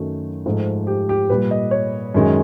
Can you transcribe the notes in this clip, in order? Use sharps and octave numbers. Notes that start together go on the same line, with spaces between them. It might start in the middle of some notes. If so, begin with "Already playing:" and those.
Already playing: F#2 D#3 F#3 A3
G#2 F3 A3
G4
G4
A#2 G3 B4
D#5
C#5
F#2 D#3 G#3